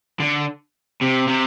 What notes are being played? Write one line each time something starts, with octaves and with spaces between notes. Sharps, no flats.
D3
C3
C3